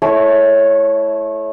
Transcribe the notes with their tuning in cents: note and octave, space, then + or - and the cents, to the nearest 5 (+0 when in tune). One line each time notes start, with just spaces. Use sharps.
A3 -20 E4 +0 C#5 +0